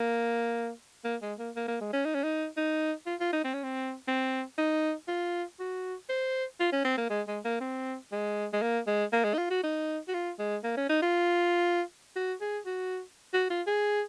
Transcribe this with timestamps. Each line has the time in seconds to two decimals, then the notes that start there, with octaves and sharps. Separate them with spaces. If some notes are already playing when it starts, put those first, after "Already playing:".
Already playing: A#3
1.05 A#3
1.22 G#3
1.39 A#3
1.56 A#3
1.68 A#3
1.81 G#3
1.93 C#4
2.05 D#4
2.14 C#4
2.23 D#4
2.57 D#4
3.06 F4
3.20 F4
3.33 D#4
3.44 C4
3.54 C#4
3.64 C4
4.08 C4
4.58 D#4
5.08 F4
5.59 F#4
6.09 C5
6.60 F4
6.72 C#4
6.85 C4
6.97 A#3
7.10 G#3
7.28 G#3
7.45 A#3
7.61 C4
8.12 G#3
8.53 G#3
8.62 A#3
8.87 G#3
9.13 A#3
9.24 G#3
9.34 D#4
9.38 F4
9.50 F#4
9.63 D#4
10.08 F#4
10.14 F4
10.39 G#3
10.64 A#3
10.77 C#4
10.89 D#4
11.02 F4
12.16 F#4
12.41 G#4
12.66 F#4
13.34 F#4
13.50 F4
13.67 G#4